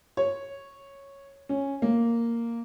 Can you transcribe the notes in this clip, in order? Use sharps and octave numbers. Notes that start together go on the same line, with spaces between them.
C#5
C#4
A#3